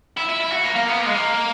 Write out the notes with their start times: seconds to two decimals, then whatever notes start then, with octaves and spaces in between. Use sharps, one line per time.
0.17 E4
0.29 E4
0.41 E4
0.52 F#4
0.64 A#3
0.76 A#3
0.88 B3
0.99 A#3
1.06 G#3
1.14 A#3